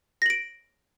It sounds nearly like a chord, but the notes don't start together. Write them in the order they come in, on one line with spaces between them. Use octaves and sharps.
A#6 F#7 D7